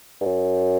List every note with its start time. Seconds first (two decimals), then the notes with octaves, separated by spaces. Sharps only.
0.21 G2
0.25 F#2